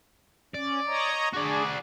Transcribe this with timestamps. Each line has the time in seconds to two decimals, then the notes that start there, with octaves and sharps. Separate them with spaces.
0.54 C#4 D5
0.86 C#5 D#5 A#5
1.34 D4 F#4 G#4 D5